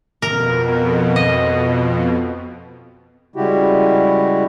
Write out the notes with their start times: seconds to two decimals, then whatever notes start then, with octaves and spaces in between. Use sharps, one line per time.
0.22 F2 B2 A#4
1.16 D#5
3.36 C#3 G3 G#3 E4 F#4 G4